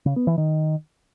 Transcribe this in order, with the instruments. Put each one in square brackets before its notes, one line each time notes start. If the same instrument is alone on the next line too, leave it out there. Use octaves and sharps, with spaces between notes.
[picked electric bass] C#3
B3
E3
D#3